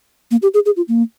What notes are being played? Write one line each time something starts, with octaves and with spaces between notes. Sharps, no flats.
A#3
G4
G#4
G#4
F4
A#3